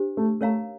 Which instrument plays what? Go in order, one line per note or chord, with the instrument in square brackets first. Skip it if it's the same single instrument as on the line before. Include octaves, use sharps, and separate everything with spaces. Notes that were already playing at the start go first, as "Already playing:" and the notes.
Already playing: [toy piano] D4 G4 C5
[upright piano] A3
[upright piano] A3 [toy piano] A#4 C#5 F5 A#5